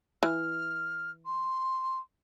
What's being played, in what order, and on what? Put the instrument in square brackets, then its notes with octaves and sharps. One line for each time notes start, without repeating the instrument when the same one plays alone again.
[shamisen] E3 [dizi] F6
[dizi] C6